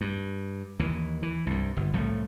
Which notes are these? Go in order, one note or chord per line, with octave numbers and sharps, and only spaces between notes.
G2
D#2 E3
E3
C2 G2
G1
C2 A2 F3 A3